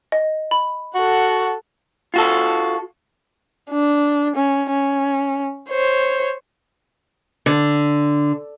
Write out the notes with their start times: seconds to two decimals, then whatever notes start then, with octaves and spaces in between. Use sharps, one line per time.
0.12 D#5
0.51 B5
0.95 F#4 A4 F#5
2.14 F4 F#4 A4
3.70 D4
4.36 C#4
4.70 C#4
5.70 C5 C#5
7.46 D3